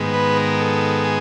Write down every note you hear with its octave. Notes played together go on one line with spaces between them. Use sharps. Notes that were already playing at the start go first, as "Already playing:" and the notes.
Already playing: G#2 D#3 G#3 B3
B4
A#4
A4
G#4